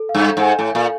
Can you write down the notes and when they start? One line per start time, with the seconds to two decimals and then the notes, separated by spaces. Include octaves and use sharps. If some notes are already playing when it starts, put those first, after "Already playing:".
Already playing: A4
0.09 F5
0.15 G2
0.25 A4
0.37 G#2
0.42 G#5
0.58 A2 A4
0.75 A#2 F5